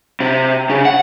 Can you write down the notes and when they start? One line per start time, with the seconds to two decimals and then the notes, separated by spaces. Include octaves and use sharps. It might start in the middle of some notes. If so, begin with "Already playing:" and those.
0.20 C3
0.70 C#3
0.85 F#5